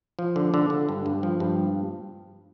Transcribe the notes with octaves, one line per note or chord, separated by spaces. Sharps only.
F3
D3
D3
D3
G2
G2
F3
G2